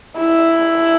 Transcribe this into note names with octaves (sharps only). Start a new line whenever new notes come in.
E4